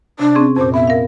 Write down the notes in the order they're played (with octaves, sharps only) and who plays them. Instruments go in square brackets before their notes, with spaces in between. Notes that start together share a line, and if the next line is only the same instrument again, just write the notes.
[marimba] C3 [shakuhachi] D4
[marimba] C4 C#4 G#4
[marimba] F2 A#2 [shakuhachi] C5
[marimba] B3 [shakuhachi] E5
[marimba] A#4 F5